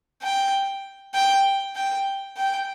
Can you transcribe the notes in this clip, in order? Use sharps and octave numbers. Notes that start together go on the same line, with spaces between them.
G5
G5
G5
G5